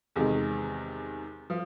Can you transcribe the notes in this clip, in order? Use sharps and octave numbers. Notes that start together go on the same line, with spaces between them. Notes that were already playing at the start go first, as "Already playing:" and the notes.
E2 C3 D#3 G#3
F3